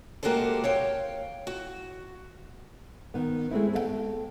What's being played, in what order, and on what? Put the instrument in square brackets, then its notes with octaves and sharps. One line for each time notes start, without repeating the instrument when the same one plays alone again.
[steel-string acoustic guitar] G#3 A#3 F#4 G4 A4 C5
C#5 F5 G5
F#4
[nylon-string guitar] D#3 B3
G#3 A3 C4 E4
A4 F5 G5